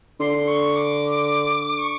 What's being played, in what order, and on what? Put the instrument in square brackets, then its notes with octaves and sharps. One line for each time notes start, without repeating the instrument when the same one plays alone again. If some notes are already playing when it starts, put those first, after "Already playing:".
[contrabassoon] D3 [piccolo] C6
[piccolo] C#6
D6
C#6